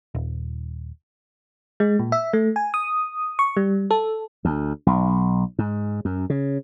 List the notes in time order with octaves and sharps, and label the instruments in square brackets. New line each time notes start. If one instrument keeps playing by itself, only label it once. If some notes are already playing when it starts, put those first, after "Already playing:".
[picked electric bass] D#1
[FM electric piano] G#3
A#2
E5
A3
G#5
D#6
C#6
G3
A4
[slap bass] D2
B1
G#2
F#2
C#3